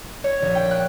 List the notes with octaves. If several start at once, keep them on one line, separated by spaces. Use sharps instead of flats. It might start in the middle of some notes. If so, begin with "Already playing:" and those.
C#5
A#1
G5
F#6